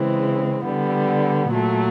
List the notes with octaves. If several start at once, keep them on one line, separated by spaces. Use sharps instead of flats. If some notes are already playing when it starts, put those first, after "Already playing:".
Already playing: C#3 E3 G#3 C4
D3 G3 B3
A#2 F#3 A3